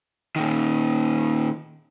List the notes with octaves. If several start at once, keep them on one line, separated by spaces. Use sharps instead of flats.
A#2 D#3